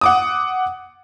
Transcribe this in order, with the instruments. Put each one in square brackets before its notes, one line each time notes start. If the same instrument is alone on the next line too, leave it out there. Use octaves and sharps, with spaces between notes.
[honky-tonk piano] F#5 D6 D#6